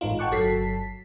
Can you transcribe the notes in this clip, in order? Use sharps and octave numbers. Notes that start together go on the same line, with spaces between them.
A1 G#2 D#4 F4
F#5 G5 A5 C#6 D6 F#6
G1 F#3 A4 A5 B6 C7